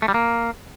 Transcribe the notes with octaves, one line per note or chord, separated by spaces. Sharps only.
A3
G3
A#3